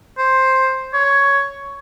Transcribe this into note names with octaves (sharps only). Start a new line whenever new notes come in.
C5
C#5